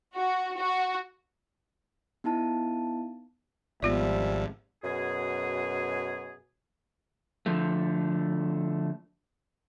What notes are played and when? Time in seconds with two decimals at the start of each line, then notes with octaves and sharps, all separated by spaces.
0.15 F#4
0.57 F#4
2.24 B3 D#4 E4 A5
3.83 G#1 F3 G3 B3 F4 D5 E5
4.84 F#2 B2 G#4
7.46 D3 F3 A3